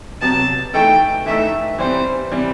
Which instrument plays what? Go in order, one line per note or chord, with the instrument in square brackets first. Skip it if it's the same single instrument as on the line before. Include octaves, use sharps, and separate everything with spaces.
[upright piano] C3 F#3 B3 [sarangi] A5
[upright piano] E3 A3 D#4 A4 [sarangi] G5
[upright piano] E3 A3 D#4 A4 [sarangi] E5
[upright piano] E3 G3 C4 [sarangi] C5
[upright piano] E3 G3 C4